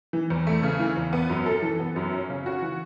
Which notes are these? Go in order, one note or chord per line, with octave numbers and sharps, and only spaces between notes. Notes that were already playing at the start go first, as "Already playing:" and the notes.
E3
E2
A3
C#3
E3
E2
B3
F#2
A4
E3
B3
F#2
C#4
C#3
F#4
E3